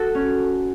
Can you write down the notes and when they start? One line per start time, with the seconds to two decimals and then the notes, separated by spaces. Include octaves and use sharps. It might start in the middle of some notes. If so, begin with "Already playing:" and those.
Already playing: F#4 A4
0.15 C#4